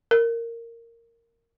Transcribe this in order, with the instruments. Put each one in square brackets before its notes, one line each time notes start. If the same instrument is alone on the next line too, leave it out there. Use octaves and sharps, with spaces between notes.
[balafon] A#4